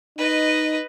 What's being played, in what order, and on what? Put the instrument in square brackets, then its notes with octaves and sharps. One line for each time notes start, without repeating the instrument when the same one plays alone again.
[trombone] D#4 [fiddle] B4 D#5